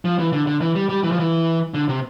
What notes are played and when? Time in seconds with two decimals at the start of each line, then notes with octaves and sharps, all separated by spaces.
0.05 F3
0.19 E3
0.33 D3
0.47 D3
0.61 E3
0.76 G3
0.89 G3
1.03 E3
1.12 F3
1.19 E3
1.74 D3
1.89 C3